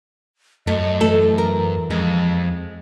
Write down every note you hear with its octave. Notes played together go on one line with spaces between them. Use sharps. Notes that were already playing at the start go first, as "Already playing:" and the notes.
F#2 A3 D#5
E3 A3 A4
A#4
F2 G#3